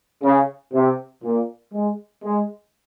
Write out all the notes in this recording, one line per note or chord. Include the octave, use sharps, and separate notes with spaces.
C#3
C3
A#2
G#3
G#3